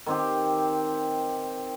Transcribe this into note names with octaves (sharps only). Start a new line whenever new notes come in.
D#3 C4 G4